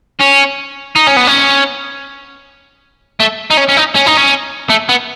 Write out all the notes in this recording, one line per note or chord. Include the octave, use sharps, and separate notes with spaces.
C#4
D#4
C#4
B3
C#4
A3
D#4
C#4
C#4
D#4
C#4
D#4
C#4
A3
B3